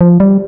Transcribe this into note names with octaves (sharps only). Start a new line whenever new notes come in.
F3
G3